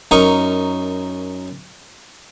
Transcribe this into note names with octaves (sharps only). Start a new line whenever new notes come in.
F#2 D#4 A#4 C#6 D#6